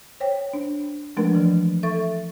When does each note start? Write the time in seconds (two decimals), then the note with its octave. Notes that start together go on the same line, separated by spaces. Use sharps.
0.20 C5 C#5 G5
0.54 D4
1.17 F3 G#3 A3 D4 A#4 B4
1.34 E3 F3
1.83 A4 E5 C#6 A6